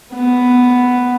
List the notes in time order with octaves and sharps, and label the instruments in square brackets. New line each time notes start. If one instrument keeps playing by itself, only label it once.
[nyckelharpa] B3